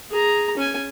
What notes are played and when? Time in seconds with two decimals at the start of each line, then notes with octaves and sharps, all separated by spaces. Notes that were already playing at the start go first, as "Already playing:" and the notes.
0.11 G#4 A#5
0.57 C#4 G#5